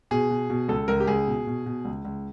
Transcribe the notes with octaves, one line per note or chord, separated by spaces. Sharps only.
B2 G#4
B2
B2
C#2 A4
C#2 A#4
G4
C#2 G#4
B2
B2
B2
C#2
C#2